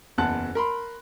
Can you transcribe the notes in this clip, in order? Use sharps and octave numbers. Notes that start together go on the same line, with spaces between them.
F#1 E2 F#5 A5 F#6
A#4 B5 C6